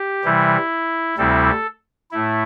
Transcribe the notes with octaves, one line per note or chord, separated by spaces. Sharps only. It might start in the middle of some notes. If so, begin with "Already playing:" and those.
Already playing: G4
C3 E3 G3 E4
D2 C3 G3 C4 E4 A4
A2 A3 E4